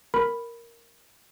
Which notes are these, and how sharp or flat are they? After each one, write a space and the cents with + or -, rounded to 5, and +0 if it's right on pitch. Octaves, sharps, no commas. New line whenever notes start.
A#4 +0 B5 +0